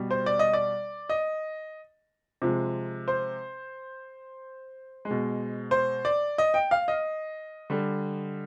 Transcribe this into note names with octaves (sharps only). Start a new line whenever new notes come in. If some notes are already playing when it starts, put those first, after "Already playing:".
Already playing: B2 G3
C5
D5
D#5
D5
D#5
C3 F3 G#3
C5
G#3
B2
C5
D5
D#5
G5
F5
D#5
D3 G3